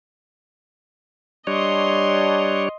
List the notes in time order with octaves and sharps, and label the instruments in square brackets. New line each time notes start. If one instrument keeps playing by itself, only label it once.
[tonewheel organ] G3 D4 C#5 [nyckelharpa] D#5 C6